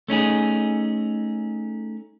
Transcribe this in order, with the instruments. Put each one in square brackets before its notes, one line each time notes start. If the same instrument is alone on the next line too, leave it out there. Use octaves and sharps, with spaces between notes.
[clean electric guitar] A3 C#4 D#4 G#4